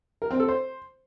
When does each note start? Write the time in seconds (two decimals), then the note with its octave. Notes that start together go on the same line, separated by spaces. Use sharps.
0.22 A#4
0.31 C4
0.40 A4
0.48 C5